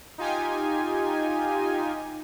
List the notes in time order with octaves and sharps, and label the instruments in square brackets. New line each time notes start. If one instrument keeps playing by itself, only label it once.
[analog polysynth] D#4 F4 G4 G#5